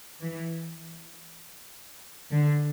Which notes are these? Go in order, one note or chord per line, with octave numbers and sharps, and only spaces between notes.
E3
D3